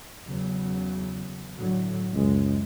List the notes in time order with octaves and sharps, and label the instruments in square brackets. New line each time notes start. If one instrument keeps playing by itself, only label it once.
[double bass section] E2 C#3 F#3
A2 D3 F#3
[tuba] C#2 [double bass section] F#2 G#3